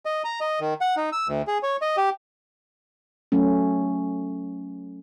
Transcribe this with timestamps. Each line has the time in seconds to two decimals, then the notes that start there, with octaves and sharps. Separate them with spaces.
0.05 D#5
0.24 A#5
0.41 D#5
0.60 D#3
0.81 F#5
0.97 D#4
1.12 E6
1.28 D2
1.47 G#4
1.63 C#5
1.82 D#5
1.97 G4
3.32 F#3 A3 C#4